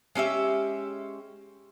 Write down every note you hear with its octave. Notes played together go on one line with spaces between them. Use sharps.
G#3 C#4 G4 E5